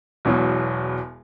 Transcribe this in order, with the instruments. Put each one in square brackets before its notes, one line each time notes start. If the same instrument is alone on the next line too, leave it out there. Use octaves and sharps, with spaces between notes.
[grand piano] E1 E2 B2 F#3